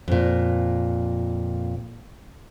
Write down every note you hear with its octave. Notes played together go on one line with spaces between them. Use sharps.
F2 A#2